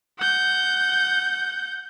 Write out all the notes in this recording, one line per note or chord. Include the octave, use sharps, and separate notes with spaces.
F#5 G6